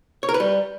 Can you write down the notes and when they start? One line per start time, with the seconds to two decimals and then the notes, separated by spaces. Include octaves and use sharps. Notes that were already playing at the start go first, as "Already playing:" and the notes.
0.23 C#5
0.29 A#4
0.34 B4
0.40 G3